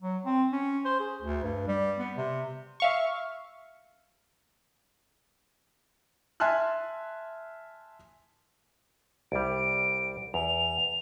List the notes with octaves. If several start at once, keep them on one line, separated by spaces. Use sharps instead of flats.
F#3
C4
C#4
C5
G#4
D2
G2
G3
B3
C3
E5 F5 C#6
E5 G#5 A5 C6 F6 F#6
C2 G3 D7
E2 F7